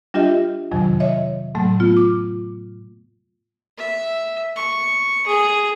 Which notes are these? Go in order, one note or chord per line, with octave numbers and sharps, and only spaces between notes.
G3 D4 F4 G4 D#5 E5
F2 C3 D#3 F#3
C#5 D#5 E5
A2 F#3 A3
B3 F4
D6
E5
C#6
G#4